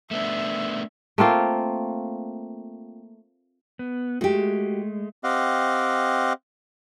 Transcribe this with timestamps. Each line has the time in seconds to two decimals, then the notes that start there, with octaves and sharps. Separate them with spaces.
0.11 A3 B3 D4 E5
1.18 A3 A#3 C4 F4
3.79 B3
4.21 G#3 A3 F#4 G4
5.24 C4 G4 D#5 F5 F#5